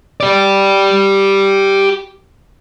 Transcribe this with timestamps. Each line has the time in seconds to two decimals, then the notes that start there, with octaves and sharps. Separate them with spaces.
0.20 G4 D5